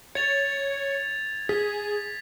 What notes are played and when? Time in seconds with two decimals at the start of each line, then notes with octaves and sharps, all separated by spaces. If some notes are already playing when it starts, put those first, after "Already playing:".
0.15 C#5 G#6 A6 F7
1.49 G#4 B6